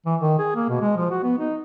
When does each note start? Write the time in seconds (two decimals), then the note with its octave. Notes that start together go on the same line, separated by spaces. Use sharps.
0.06 E3
0.21 D#3
0.39 G#4
0.56 A#3
0.69 B2
0.81 G#3
0.96 F3
1.11 F#4
1.23 B3
1.38 D#4